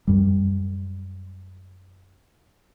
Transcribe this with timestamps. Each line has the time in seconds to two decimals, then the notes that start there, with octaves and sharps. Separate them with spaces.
0.07 F#2 G3